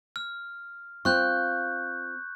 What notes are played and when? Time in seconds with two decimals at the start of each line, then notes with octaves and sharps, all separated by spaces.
0.16 F6
1.05 C4 F4 C#6 F#6 G6